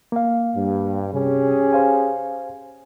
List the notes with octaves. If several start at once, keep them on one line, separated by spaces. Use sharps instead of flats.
A#3 F5
G2
C3 C#4 G4 G#4
C5 F5 G#5